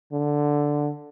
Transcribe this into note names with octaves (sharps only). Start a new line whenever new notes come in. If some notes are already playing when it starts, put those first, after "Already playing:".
D3